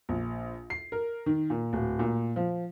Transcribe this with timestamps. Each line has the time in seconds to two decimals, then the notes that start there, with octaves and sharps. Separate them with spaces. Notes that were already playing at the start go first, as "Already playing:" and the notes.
0.09 A#1
0.70 C7
0.92 A#4
1.26 D#3
1.50 A#2
1.73 D1
1.99 A#2
2.36 F3